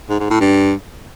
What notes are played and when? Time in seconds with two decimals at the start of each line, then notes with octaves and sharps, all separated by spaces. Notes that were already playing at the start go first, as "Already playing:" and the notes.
0.10 G#2
0.20 G#2
0.31 A2
0.41 G2